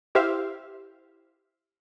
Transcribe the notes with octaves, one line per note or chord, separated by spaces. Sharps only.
E4 G4 C5 E5 F5